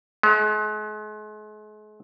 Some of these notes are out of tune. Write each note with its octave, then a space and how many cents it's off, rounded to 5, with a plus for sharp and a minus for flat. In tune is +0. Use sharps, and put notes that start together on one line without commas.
G#3 +40